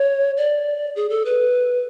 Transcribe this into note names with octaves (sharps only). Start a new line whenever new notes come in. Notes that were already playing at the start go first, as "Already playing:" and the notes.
Already playing: C#5
D5
G#4
A4
B4